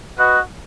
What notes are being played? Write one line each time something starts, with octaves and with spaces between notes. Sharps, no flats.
F#4 B4 D#5 F#5